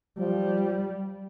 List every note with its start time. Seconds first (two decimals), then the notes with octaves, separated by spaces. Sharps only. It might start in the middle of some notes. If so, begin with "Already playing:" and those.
0.19 F3 G3